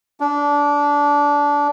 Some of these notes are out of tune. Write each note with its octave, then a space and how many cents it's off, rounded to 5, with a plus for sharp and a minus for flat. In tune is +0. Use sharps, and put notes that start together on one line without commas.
D4 -20